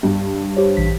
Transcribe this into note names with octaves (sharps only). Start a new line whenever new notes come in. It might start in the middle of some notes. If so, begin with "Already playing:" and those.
G2
G4 C5 C#5
A#1 E3 B6